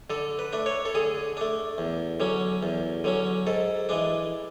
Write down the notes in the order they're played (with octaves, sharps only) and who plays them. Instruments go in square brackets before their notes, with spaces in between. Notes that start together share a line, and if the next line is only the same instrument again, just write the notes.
[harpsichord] D3 A4
B4
A3 D4
C#5
A4
D3 G#4
A3 D4
E2
D3 F#3 C#4
E2
D3 F#3 C#4
G#2 A4
E3 G#3 D4